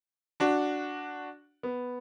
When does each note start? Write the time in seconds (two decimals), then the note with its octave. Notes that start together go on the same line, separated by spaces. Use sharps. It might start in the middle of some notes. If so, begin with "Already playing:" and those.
0.40 D4 F#4
1.63 B3